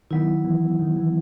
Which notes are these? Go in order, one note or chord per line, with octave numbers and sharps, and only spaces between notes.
D#3 F#3 B3 E4
E3
D#3
E3